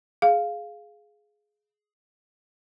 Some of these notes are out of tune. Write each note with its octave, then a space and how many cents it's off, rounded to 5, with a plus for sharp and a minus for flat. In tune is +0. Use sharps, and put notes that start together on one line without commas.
G#4 +10 F5 +0